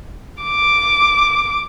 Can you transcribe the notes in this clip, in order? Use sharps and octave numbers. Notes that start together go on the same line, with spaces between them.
D6